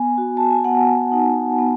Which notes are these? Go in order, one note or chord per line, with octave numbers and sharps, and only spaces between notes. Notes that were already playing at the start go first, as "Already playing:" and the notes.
Already playing: B3 G#5
F#4
A5
G#5
B3 F#5
D#4
B3